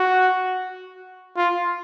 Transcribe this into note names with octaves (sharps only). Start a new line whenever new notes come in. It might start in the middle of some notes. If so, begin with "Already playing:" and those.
Already playing: F#4
F4